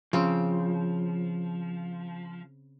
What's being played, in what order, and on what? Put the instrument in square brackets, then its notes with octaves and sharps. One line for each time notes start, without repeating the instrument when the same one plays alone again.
[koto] C#3 C4 [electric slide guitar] F3